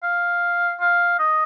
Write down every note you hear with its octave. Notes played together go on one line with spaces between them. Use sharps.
F5
F5
D#5